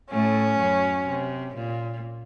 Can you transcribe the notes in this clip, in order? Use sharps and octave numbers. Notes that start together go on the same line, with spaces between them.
A2 A3 C#4
F#2 F#3
C3
A#2